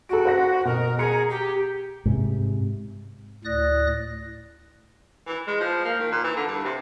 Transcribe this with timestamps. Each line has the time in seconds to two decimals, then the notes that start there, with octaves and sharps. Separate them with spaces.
0.09 F#4 A4 D7
0.25 C5 F#5 A#6
0.65 B2 A#4
0.99 G#4 A#5 C#7
1.30 G4
2.05 G#2 C3
3.45 D2 A2 D5 D#6 F#6 A#6
5.27 E3
5.47 G#3
5.60 F3
5.85 A#3
5.99 D#3
6.12 A#2
6.24 E3
6.36 D3
6.48 G2
6.64 C3